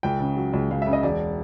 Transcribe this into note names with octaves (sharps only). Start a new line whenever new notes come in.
C#2 G5
C#3
F#3
C#2
C#2 F5
C#3 E5
D#5
E1 D5